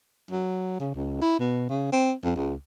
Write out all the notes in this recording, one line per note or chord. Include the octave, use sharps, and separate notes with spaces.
F#3
C#3
C#2
E4
B2
C#3
C4
F2
C#2